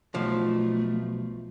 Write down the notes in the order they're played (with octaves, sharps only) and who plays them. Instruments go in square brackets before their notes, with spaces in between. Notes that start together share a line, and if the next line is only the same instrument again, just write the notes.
[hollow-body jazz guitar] B1 F3 [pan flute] A3